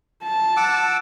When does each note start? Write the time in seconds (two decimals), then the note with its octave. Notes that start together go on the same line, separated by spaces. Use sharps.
0.23 A5
0.57 F#5 D6 E6